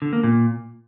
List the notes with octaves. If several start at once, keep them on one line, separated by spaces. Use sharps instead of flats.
D3
A#3
A#2